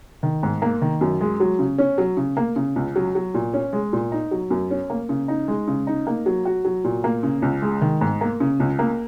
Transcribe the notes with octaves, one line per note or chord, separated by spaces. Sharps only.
D#3
G#2
A#3
D#3
F#2
G#3
F#3
C#3
C#4
F#3
C#3
A#3
C#3
C#2
F#3
F#3
A#2
C#4
G#3
A#2
D#4
F#3
F#2
C#4
A#3
C#3
D#4
G#3
C#3
D#4
A#3
F#3
F#4
F#3
A#2
A#3
C#3
C#2
G#3
D#3
G#2
A#3
C#3
C#2
A#3